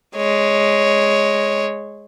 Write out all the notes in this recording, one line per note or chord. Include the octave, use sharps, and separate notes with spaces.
G#3 C#5